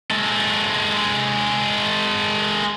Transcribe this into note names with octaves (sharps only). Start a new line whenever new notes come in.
G#3 A4